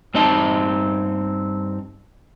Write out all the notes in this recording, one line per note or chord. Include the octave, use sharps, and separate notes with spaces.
G2 C4 D#4 D#5 A5